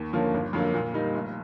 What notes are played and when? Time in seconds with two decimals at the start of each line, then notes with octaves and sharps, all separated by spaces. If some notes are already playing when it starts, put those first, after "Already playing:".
Already playing: D#2
0.13 D3 F3 A#3 C#4
0.34 G1
0.53 F2 D3 F#3 A#3
0.74 A#2
0.94 G3 A#3 D#4
1.14 F1